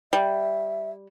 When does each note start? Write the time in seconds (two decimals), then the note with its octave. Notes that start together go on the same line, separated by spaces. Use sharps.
0.13 G3 E5